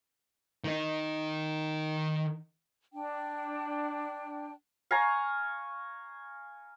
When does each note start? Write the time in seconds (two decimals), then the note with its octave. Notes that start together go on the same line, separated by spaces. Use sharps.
0.64 D#3 D#4
2.93 D4 G5
4.91 F5 G#5 A#5 C#6